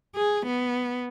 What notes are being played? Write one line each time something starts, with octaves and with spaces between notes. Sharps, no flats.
G#4
B3